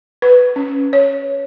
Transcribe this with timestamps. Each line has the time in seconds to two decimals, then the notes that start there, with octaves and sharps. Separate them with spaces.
0.22 B4
0.56 C#4
0.93 C#5